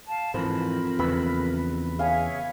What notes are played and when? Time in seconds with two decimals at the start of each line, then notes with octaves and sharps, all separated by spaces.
0.09 F5 A5
0.34 F2 G#2 E3 A#4 C5 B5
0.99 E2 C#3 B4 E6
1.99 G#4 C#5 E5 F5 G#5